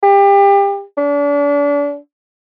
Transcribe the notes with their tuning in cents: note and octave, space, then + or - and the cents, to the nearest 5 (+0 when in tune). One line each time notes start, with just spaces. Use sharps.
G4 +30
D4 -35